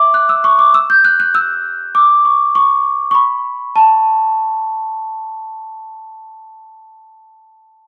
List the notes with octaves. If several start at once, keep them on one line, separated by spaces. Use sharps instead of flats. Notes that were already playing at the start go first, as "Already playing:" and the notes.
Already playing: E5 D6
F#6
E6
C#6
D6
E6
G6
F#6
F#6
E6
D6
C#6
C#6
C#6
B5
A5